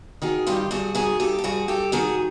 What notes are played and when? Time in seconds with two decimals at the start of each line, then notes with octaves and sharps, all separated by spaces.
0.22 D#3 F#4 G#4
0.47 G2 F4 G4
0.71 G2 F#4 G#4
0.95 D#3 F#4 G#4
1.20 G2 G4 A4
1.39 A4
1.44 G2 F#4 G#4
1.68 G2 G4 A4
1.92 D#3 F#4 G#4